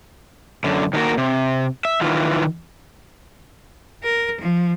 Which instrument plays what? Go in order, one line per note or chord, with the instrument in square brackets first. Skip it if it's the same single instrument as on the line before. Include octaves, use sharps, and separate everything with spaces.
[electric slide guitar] F#2 D3
D#3 A3 A#3 F#4 A#4
C3
E5
D#3 E3 F4
[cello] A#4
F3